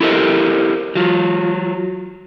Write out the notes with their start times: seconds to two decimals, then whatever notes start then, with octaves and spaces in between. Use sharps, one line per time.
0.01 E4 G4 A4 A#4 C5 D#5
0.95 F#3 F4